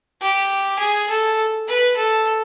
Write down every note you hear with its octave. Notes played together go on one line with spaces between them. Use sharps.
G4
G#4
A4
B4
A4